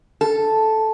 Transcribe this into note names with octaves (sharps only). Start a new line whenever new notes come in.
A4